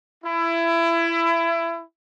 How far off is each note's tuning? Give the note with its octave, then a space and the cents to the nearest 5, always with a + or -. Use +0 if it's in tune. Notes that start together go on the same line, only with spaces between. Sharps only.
E4 +25